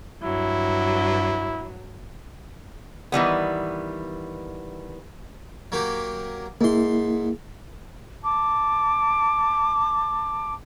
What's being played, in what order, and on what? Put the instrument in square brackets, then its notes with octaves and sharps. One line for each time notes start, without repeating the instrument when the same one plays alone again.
[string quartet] G2 F#3 [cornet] E4
[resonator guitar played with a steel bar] D#3 E3 G3 B3
[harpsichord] F#3 A#3 G4
[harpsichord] G#2 C6 [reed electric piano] A#3 E4
[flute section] A5 D6